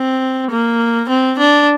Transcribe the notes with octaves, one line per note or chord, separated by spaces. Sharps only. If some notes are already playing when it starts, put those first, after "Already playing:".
Already playing: C4
A#3
C4
D4